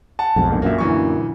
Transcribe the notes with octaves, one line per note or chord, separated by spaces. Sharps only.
F#5 A5
B1 F2 G#2
A#2 D3
F#2 A#2 A#3 E5
D2 E3 C#6